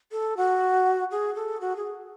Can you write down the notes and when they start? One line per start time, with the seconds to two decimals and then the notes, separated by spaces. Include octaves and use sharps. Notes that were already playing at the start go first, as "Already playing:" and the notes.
0.12 A4
0.37 F#4
1.11 G#4
1.35 A4
1.61 F#4
1.77 G#4